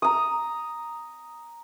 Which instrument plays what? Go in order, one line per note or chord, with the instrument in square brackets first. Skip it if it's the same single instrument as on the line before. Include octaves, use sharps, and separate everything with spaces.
[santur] A#5 D#6